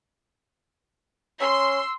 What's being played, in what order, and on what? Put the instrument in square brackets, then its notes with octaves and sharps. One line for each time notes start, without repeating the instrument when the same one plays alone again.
[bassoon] C#4 [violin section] C6 [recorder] E6